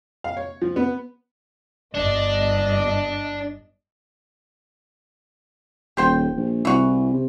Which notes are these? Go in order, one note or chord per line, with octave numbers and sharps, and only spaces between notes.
F5
C#5
F3
B3
G1 D4 D#5
D#1 G4 C5 G5
A#1
C2 E3 F#4
C3